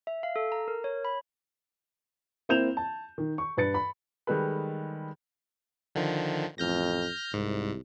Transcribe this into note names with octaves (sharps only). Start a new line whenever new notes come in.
E5
F5
A4
A#5
A#4
C#5
B5
A#3 C4 E4 G6 E7 F7
A5
D#3
C#6
G2 B4 A6 C#7
B5
D#3 G3 G#3 A4 B4
D3 D#3 F3
A1 F2 F6 G6 A#6
C2 G#2